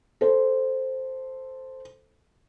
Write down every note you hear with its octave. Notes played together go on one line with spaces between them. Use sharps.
A4 C5